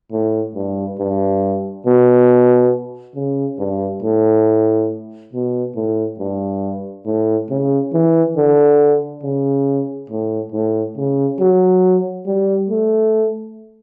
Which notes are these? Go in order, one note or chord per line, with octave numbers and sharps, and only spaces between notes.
A2
G2
G2
B2
C#3
G2
A2
B2
A2
G2
A2
C#3
E3
D3
C#3
A2
A2
C#3
F#3
G3
A3